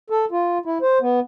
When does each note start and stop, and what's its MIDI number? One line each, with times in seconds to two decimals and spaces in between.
0.10 0.25 69
0.31 0.58 65
0.66 0.78 64
0.82 0.98 72
1.01 1.20 59